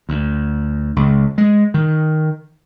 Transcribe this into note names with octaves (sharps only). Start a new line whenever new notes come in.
D2
C#2
G#3
D#3